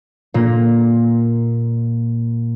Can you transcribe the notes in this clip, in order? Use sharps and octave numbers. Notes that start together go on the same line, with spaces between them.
A#2 A#3